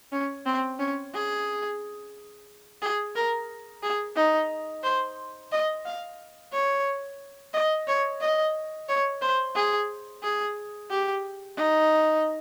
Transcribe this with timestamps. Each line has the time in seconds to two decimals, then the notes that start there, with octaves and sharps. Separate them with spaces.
0.12 C#4
0.46 C4
0.79 C#4
1.14 G#4
2.82 G#4
3.15 A#4
3.83 G#4
4.16 D#4
4.83 C5
5.52 D#5
5.86 F5
6.53 C#5
7.54 D#5
7.88 C#5
8.21 D#5
8.89 C#5
9.22 C5
9.55 G#4
10.23 G#4
10.90 G4
11.57 D#4